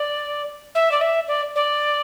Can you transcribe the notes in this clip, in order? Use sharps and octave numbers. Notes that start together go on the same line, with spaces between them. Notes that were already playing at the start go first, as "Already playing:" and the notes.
Already playing: D5
E5
D5
E5
D5
D5